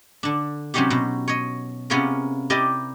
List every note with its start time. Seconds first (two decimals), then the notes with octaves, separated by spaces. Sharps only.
0.23 D3 D4
0.74 C3 F#3 C4 C#4 D#4 G4
0.90 B2
1.28 C#5 D#5
1.90 C3 B3 C#4 F4 G#4 A#4
2.50 E4 G4 A#4 D5 D#5